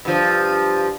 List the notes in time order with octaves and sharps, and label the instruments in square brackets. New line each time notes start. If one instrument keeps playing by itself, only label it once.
[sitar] G2 F3